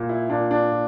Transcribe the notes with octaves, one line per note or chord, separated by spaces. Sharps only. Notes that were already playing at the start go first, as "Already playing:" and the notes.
Already playing: A#2
E4
A#2 D4
D4
A#2